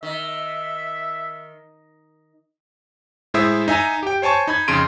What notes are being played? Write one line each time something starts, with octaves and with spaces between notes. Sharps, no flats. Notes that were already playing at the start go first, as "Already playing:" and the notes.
D#3 E5
A2 G#3 E4 C5 E5 D#6
D#4 E5 G#5 A#5
G4 G5
C5 C#5 G#5 A5 C#6
D#4 B5 G#6
F2 C#3 C6 D7 D#7